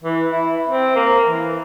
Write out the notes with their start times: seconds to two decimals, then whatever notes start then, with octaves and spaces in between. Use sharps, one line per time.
0.04 E3
0.31 E4
0.68 C4
0.95 A#3
1.27 E3